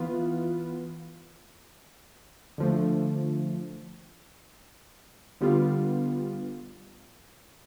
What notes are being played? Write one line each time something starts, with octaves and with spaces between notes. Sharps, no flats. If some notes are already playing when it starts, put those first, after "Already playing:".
Already playing: E3 B3 F4 B4
D3 F3 A3
D3 G3 B3 F4